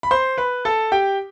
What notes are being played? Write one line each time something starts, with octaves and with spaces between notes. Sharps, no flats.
B5
C5 C6
B4 B5
A4 A5
G4 G5